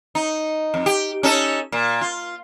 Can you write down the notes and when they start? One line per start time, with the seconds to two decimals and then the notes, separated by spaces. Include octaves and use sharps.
0.15 D#4
0.74 F2
0.86 G4
1.23 C#4 D#4 A4
1.72 A#2
2.01 F4